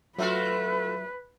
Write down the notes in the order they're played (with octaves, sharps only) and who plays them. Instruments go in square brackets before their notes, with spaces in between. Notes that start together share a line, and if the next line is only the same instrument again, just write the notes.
[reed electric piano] F#3 E5 [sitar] A3 F4 F#4 [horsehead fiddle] B4